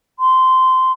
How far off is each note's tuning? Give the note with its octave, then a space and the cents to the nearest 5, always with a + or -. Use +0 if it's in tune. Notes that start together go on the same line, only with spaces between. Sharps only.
C6 -15